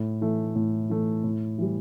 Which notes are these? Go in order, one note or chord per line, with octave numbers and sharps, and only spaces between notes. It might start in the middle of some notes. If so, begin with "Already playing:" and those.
Already playing: A2
E3 A3
A2
E3 A3
A2
E3 G3